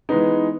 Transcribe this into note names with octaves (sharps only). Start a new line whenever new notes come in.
E3 G#3 B3 D#4